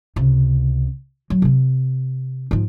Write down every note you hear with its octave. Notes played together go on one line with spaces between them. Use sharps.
C#2 C3
F#3
C3 C4
G#2 F3